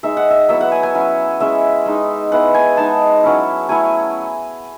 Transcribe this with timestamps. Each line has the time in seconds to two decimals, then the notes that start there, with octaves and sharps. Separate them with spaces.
0.03 G#3 D#4 E5
0.17 F#5
0.30 E5
0.48 F#3 B3 E4 E5
0.61 F#5
0.72 G#5
0.83 G#5
0.94 F#3 C#4 E4
1.40 G#3 C#4 E4 E5
1.86 G#3 D#4
2.31 G#3 B3 E4 F#5
2.54 G#5
2.77 G#3 D#4 A5
3.23 F#3 C#4 E4
3.69 F#3 A3 E4 G#5